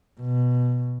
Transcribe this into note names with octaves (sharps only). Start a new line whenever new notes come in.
B2